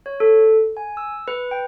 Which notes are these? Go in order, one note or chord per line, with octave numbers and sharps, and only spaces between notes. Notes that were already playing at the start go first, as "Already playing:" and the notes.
C#5
A4
G#5
E6
B4
G5